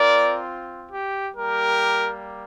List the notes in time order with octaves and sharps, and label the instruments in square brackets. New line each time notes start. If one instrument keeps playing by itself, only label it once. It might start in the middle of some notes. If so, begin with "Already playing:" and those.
Already playing: [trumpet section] C4 F4 A#4 D5
G4
G3 A#3 G4 A#4